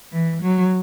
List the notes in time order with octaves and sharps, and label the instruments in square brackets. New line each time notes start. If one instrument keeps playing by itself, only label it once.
[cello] E3
F#3